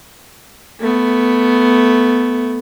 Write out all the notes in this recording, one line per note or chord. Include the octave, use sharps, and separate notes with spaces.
A3 B3